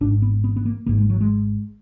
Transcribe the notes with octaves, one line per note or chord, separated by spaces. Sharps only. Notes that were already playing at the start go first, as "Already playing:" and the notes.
G#1 G#2 D4
B3
B3
B3
A#3
G#1 G#2 A#3
G#3
F#3
G#3